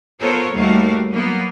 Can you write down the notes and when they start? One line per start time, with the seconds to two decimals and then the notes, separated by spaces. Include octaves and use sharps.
0.20 B3 F4 A4 A#4 C5 C#5
0.54 D#2 G3 A3 F#4 A#4 F5
1.11 F#3 A#3 B3